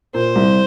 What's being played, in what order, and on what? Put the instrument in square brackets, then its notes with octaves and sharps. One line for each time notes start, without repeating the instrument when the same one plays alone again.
[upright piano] A#2 [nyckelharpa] C5
[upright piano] C2